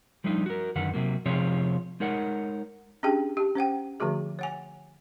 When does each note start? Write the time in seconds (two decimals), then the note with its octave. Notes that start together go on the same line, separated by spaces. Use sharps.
0.24 F3 G3 A3 D4 D#4
0.46 F#4 A#4
0.75 F#2 D3 D#3 B4 F#5
0.94 C3 F#3 A#3
1.26 C3 F3 C4 F4 G#4 C#5
2.00 G#3 D#4 A#4 C#5 F#5
3.03 C#4 D4 G4 G#4 G5 A5
3.37 G4 A5
3.55 C#4 C5 F#5 G5
4.00 D3 F3 A3 F#4 G#4
4.39 C#5 F#5 G#5